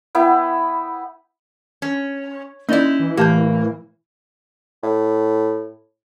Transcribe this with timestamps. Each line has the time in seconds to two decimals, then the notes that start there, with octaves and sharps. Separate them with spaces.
0.15 B3 E4 G5
1.82 C#4
2.69 A#3 C#4 D#4 E4 D5 D#5
2.99 E3
3.17 A2 A#3 G4 A5 G6
4.83 A2